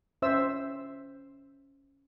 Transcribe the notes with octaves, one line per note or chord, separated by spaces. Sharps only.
C#4 C5 E5 E6